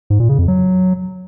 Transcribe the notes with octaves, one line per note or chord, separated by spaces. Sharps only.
G#2
A#2
C#3
F2
F#3